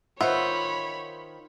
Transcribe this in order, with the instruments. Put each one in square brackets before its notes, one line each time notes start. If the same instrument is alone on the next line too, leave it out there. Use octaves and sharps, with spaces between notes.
[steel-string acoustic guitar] D#3 C5 [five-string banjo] F4 E5 [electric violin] C#5 B5 [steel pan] F#5